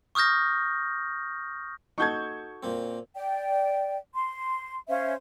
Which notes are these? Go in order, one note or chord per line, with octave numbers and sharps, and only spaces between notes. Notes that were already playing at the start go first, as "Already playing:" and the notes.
C#6 D#6 F6 G6 A#6
D#4 F#4 A4 C#6 G6 G#6
A#2 A#3 C4
D5 G5
C6
C#4 C5 E5 F5